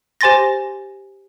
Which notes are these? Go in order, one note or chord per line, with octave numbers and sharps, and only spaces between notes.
G4 C5 G#5 C6 A6 A#6